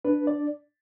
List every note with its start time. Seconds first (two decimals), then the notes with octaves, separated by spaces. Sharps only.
0.05 D4 B4
0.27 D5